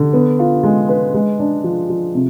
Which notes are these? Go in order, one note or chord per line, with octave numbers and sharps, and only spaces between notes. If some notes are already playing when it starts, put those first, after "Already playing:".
Already playing: D3
B3
F4
G#3
B4
G#3
D4
F3
F3
C3